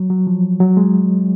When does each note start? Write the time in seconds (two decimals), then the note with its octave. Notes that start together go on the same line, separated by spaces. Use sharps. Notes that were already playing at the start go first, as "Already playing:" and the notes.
Already playing: F#3
0.10 F#3
0.27 F3
0.60 F#3
0.77 G#3